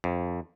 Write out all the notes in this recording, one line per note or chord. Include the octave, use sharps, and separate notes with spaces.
F2